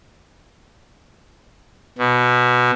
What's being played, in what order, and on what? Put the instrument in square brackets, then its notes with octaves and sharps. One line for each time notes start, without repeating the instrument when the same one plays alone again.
[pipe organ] B2